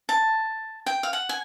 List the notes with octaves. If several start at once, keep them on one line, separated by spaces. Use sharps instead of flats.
A5
G5
F5
F#5
G#5